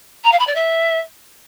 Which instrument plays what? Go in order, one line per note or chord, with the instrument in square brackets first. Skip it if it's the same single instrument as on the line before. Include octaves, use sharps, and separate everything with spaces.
[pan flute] A#5
F5
B5
D5
E5